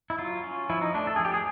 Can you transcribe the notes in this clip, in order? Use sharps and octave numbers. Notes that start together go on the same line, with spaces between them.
E4
F#3 F4
C#4
F3 E4
D#4
A3 D4
A4
G#4
F3
G4
G#4